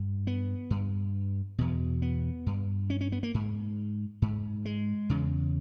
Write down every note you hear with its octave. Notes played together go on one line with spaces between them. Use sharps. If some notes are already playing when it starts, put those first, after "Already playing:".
Already playing: G2
B3
G2
E2 B2
B3
G2
C#4
C#4
B3
A#3
G#2
G#2
G#3
E2 C#3